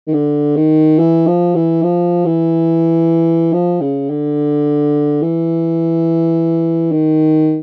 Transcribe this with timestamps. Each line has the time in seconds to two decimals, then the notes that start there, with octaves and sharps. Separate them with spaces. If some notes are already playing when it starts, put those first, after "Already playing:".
0.07 D#3
0.14 D3
0.56 D#3
0.98 E3
1.27 F3
1.55 E3
1.83 F3
2.26 E3
3.53 F3
3.81 C#3
4.10 D3
5.22 E3
6.92 D#3